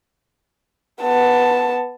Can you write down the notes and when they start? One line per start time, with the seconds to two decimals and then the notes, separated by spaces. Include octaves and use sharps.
1.02 B3 A5